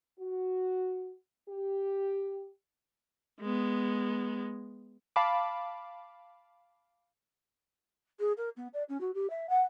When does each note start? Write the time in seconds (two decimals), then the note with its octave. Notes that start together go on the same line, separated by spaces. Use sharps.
0.19 F#4
1.49 G4
3.41 G#3 B3
5.16 F5 A5 B5 D6
8.20 G#4
8.37 A#4
8.57 B3
8.74 D5
8.89 C#4
9.01 F#4
9.15 G4
9.30 E5
9.49 F#5